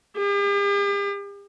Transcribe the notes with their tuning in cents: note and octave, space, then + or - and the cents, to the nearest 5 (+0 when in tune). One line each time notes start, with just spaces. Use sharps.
G4 +45